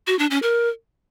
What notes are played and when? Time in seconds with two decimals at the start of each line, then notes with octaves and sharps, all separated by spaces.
0.07 F#4
0.19 D4
0.31 C#4
0.43 A#4